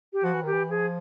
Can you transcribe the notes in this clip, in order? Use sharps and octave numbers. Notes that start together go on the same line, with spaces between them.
G4
F3 F#4
E3
D#3 G4
E3
F3 G#4